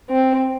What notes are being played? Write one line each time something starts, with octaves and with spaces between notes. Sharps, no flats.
C4